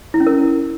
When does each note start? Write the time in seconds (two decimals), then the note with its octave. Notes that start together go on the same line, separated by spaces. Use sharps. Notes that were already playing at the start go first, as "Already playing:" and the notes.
0.14 E4
0.20 C#4
0.27 A#4